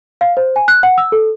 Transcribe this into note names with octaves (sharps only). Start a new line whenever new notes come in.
F5
C5
G#5
F#6
F#5
E6
A4